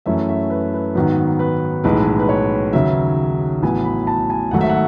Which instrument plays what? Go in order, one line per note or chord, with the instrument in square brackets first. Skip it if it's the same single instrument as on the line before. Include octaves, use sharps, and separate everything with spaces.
[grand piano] F#2 E3 A3 C#4 E5
E5
B4
B4
G#2 D#3 F#3 B3 B4
B4
B1 A2 E3 G#3 B4
B4
C#5
D#2 C#3 F#3 E5
A1 A2 F#3 B3 G#5
B5
A5
G#5
G#1 G#2 F#3 A3 F#5
E5
F#5